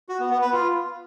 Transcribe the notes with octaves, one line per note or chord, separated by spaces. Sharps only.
F#4
B3
B3
B4
F4